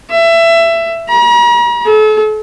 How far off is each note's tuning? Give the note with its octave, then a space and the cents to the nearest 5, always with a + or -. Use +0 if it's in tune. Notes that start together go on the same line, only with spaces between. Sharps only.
E5 +20
A#5 +45
A4 -40